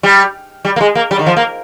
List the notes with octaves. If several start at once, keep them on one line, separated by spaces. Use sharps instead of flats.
G3
G3
A#3
G#3
A#3
G3
D#3
F3
A#3